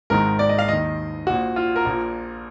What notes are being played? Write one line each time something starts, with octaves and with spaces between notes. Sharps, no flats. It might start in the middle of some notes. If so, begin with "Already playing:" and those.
G#1 G#2 D#3 A#4
D5
D#5
F5
D#2 D#3 D#5
A#1 A#2 F#4
F4
A#4
A#1 A#2